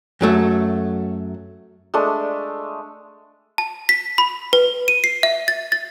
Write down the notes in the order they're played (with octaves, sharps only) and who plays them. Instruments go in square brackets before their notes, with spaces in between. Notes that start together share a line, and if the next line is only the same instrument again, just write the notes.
[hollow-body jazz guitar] F#2 F#3 A3
[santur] G#3 A3 D4
[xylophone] A5
B6
B5
B4
D#7
C7
E5
A6
A6